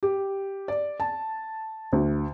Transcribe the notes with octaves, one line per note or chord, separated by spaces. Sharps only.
G4
D5
A5
D2